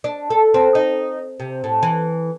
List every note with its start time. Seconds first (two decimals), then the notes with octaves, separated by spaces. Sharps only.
0.04 D4
0.30 A4
0.54 C4
0.75 D#4
1.40 C3
1.64 A2
1.83 E3